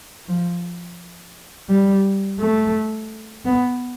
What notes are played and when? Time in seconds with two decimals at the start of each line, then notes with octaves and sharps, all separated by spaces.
0.28 F3
1.69 G3
2.40 A3
3.45 B3